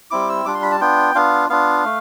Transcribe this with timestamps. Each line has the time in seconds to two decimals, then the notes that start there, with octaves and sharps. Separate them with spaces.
0.11 G3 C4 E4 D6
0.29 E6
0.45 G3 D4 F4 D6
0.55 C6
0.63 B5
0.72 A5
0.80 B3 D4 F4 G5
1.15 B3 D4 F4 F5
1.50 B3 D4 F4 F5
1.85 A3